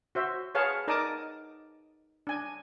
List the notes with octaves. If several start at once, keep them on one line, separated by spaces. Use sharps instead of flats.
F#4 C5 E5
G#4 B4 C#5 F5 F#5 A5
D#4 A#4 D5 A5 D6 D#6
D4 G#5